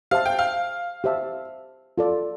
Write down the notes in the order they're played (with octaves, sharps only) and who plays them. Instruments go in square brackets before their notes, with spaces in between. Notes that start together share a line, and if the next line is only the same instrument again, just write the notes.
[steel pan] G4 C5 E5 A5 [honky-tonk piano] F5
[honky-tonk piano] G5
F5
[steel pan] G4 C5 E5 A5
F4 A4 D5